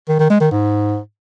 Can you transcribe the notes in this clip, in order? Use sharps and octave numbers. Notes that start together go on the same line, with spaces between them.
D#3
D#3
G#3
D#3
G#2